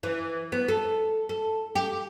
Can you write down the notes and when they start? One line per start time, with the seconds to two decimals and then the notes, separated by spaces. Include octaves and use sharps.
0.03 E3
0.52 B3
0.68 A4
1.29 A4
1.75 G4